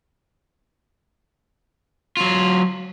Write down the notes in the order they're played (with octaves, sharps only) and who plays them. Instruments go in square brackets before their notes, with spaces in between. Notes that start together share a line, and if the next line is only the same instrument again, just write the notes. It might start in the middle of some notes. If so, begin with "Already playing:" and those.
[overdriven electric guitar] F#3 F4